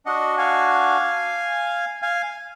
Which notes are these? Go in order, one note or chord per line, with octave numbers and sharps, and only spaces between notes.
D4 F#4 D#5 F#5
F5 G#5
F5 G#5